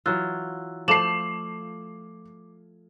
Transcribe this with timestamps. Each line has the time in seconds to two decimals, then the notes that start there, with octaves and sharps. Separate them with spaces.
0.06 E3 F#3 F4 E6 F#6
0.88 F3 A3 D6 C7 E7 F#7